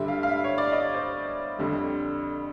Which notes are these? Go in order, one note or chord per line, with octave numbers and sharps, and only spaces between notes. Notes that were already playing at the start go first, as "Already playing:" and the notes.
Already playing: G2 D3 G3 E5
F5
F5
E5
C#5
D5
D#5
C5
F2 D3 G3